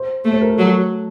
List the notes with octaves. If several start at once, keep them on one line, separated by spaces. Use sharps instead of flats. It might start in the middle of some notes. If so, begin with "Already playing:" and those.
Already playing: C5
A3
C5
A#4
A4
F#3